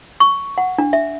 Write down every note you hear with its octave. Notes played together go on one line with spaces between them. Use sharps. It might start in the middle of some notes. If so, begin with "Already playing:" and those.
C#6
F#5
D4
E5